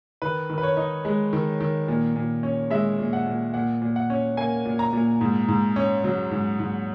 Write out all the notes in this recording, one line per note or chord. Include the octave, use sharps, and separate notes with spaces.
D#3 B4
D#3
B4
C#5
D#4
G#3
D#3
D#3
A#2
A#2
C#4
G#3 E5
A#2
F#5
A#2
A#2 F#5
A#2
F#5
C#4
A#3 G#5
A#2
A#5
A#2
G#2
G#2
C#4
F#3
G#2
G#2